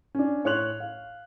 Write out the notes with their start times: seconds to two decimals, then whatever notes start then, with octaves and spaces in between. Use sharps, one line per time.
0.15 C#4 D4
0.44 A2 C#5 C6 F#6 F7 F#7
0.80 F5